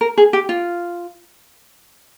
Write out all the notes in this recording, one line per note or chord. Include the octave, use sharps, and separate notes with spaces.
A#4
G#4
G4
F4